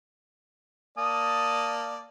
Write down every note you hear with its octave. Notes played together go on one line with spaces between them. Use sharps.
A#3 D5 A5 D#6